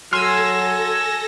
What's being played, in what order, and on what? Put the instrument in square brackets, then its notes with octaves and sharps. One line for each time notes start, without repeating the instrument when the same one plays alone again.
[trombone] F#3 [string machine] A4 A#6 [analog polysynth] G#5 E6 [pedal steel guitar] C6 F6